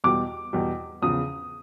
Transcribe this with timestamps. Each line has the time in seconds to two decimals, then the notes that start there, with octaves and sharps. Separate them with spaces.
0.04 E2 B2 G3 D6
0.53 E2 B2 G3
1.02 E2 C#3 F3 D#6